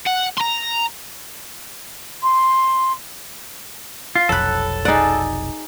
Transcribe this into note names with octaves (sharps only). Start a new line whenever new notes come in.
F#5
A#5 C6
C6
F4
F1 B1 F2 F#3 A4 B5 F#6
D#4 G#4 D5 F#5